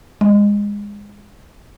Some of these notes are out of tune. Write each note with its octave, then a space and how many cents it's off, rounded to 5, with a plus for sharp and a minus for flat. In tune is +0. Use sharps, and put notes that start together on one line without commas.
G#3 -20